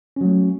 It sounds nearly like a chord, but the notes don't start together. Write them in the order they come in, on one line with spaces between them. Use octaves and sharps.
C#4 F#3 A3